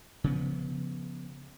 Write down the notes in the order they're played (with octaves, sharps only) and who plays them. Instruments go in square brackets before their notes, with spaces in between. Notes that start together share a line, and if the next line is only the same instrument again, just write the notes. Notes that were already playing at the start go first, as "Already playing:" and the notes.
[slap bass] C#3 F3 B3